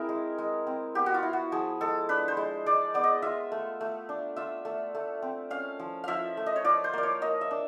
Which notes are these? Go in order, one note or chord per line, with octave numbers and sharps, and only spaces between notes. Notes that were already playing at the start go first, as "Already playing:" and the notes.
Already playing: C4 E4 G#4 A#4 E5
G#3
G#3
C4
B3 G4
F#4
F4
E4
F#4
F3 G#4
G#3 A4
D4 B4
C5
G#3
G#3 D5
B3 D5
D#5
F4 E5
A3
A3
D4
F4 E5
A3
A3
C4
C#4 F5
F3
F3 E5 F5
A3
D#5
C#5
F4 D5
C5
A#3 D5
C#5
A#3 D#5
E5
D4